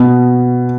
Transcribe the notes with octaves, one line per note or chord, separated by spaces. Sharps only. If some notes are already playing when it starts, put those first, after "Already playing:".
Already playing: B2